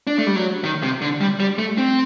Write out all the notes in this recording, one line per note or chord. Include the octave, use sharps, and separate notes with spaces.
D4
A3
G3
F#3
D#3
C3
D3
G3
G3
A3
C4